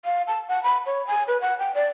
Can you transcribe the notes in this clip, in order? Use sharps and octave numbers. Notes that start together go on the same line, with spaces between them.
F5
A5
F#5
B5
C#5
G#5
B4
F#5
G5
D5